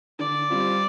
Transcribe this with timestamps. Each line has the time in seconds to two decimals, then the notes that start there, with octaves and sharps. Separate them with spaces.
0.19 D3 D5
0.50 G3 C4 F4